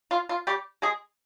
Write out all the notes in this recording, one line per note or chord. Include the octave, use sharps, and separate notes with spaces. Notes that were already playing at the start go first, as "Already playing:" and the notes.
F4
F4
G3 G4
G#3 G#4